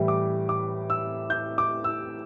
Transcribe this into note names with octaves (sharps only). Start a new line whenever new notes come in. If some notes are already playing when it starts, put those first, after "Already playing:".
Already playing: A2 E3 G3
D6
D6
E6
G6
D6
E6